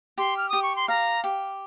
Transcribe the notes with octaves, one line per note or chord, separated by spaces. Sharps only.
G4 C6
F6
G4 D#6
C#6
C6
F5 A#5
G4